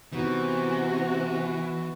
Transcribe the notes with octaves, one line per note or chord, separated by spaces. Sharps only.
C3 E3 B3 D#4 F#4